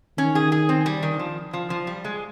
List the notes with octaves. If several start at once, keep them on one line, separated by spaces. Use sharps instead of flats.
D#3 C#4
G#4
G#4
C4
G3
D#3
F3
F3
F3
G3
G#3